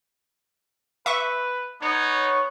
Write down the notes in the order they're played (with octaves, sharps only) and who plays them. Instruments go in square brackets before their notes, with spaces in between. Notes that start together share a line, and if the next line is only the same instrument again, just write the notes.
[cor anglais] B4 [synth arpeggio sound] E5 C#6
[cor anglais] B3 [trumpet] D#4 [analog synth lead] C#5